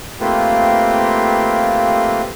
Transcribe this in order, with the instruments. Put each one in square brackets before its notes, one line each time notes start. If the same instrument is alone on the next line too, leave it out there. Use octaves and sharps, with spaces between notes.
[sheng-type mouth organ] A3 A#3 C4 F4 G4 B4